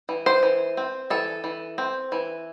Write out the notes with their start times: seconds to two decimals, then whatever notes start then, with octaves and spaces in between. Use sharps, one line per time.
0.09 E3
0.26 C5
0.43 E3
0.77 C4
1.10 E3 A4
1.44 E3
1.78 C4
2.12 E3